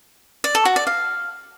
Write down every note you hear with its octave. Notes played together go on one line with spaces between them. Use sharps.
D5
A4
F#4
D5
F5